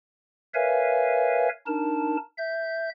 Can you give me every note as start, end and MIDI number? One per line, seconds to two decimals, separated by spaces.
0.54 1.49 70
0.54 1.49 71
0.54 1.49 73
0.54 1.49 76
0.54 1.49 77
0.54 1.49 80
1.66 2.16 62
1.66 2.16 63
1.66 2.16 70
1.66 2.16 81
2.38 2.90 76
2.38 2.90 91